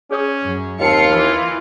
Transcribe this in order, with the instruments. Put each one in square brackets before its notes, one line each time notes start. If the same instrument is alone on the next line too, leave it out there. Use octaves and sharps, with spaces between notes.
[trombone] C#4 [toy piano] G#4 C#5 D#6
[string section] F#2
[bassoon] D#2 [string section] C4 F5 C#7 [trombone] F4 [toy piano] D#5 G#5 A5
[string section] E3